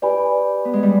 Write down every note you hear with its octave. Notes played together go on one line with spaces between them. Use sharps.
G4 B4 D5 G#5 B5
B3
G#3
G3